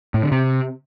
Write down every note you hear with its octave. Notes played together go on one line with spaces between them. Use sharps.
A2
D3
C3